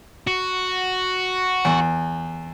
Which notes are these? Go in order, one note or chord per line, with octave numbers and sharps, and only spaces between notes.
F#4
E2